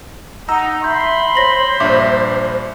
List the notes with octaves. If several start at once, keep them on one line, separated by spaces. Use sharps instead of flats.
D#4 F#5 A#5 E6
E5 B5 C6 G6
C5 C#5 A#6 F#7
A#1 G2 E5 D6